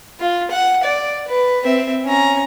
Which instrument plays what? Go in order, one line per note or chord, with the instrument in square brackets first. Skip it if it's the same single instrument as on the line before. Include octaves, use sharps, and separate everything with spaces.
[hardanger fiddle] F4
F#5
D5
B4
C4 E5
C#4 A#5